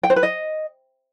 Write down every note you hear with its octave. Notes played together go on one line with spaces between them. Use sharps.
G5
C5
B4
D#5